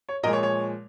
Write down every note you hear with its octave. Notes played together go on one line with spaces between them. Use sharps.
C#5
A#2 F3 G#3 A#4 D#5
C#5
C#5